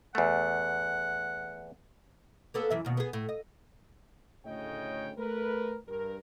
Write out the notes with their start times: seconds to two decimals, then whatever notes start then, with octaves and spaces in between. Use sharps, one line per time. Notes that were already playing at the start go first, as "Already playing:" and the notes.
0.15 E2 A3 F#5
2.54 A#3 B3 A4
2.70 F#2 E3 E5
2.85 D#2 B2
2.97 B3 G#4
3.13 A2
3.29 D#5
4.46 D2 A2 C#3 C#5 D#5 G5
5.18 A3 A#4 B4
5.88 G2 A#4